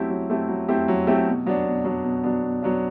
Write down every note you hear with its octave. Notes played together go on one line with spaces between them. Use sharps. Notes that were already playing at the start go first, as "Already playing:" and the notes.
Already playing: F#3 A3 C4 E4 G4
F#3
A3 C4 E4 G4
F#3
A3 C4 E4 G4
F#3
A3 C4 E4 G4
B2
F#3 B3 D4
B2
F#3 B3 D4
B2
F#3 B3 D4
B2
F#3 B3 D4